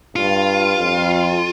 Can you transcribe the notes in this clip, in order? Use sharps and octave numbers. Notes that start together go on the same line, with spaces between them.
G2 F4
F2